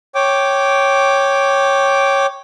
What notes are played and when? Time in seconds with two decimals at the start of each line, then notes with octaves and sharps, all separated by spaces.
0.15 C#5 G5 D6